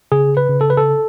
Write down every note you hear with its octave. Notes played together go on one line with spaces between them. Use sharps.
C#3 G#4
B4
C#3
A4
B4
A4